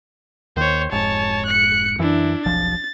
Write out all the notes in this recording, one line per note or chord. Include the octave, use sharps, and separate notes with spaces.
D#2 D#3 C5 C#5
F1 G#2 C#5 A5
F#6 C#7
F#2 E3 D4 E4
F1 B1 F3 A6